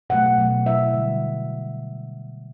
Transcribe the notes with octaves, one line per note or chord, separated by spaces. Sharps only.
B2 F#3 A3 F#5
B2 F#3 A3
B2 F#3 A3 E5
D3 G3